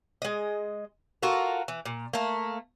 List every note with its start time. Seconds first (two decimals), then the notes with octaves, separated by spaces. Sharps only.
0.22 G#3 D#5
1.23 F4 F#4 A4 A#4
1.68 E3
1.85 A#2
2.13 A3 A#3